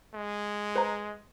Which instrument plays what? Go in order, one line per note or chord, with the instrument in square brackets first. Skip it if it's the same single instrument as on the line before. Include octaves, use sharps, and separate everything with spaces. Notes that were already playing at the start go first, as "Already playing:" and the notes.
[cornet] G#3
[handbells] B4 C5 A#5